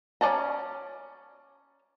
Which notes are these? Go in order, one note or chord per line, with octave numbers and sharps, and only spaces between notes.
C#4 C5 D5 A5 A#5